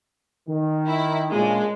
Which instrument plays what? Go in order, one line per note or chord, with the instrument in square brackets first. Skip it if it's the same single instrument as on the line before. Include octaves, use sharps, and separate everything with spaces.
[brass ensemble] D#3
[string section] E4
[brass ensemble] A#2 C#3 [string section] G#3 D4